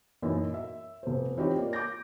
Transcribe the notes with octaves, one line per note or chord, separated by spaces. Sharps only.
F#2 A#2 E3 D#4
E5
F1 C5
E3 C4 D#4 F4 G4 C#5
A#3 F4 D5
D6 G6 A#6